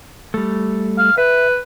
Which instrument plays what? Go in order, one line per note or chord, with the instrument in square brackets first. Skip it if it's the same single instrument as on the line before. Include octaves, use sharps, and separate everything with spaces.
[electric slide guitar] G3 A3
[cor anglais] F5
[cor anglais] B4 [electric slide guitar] E5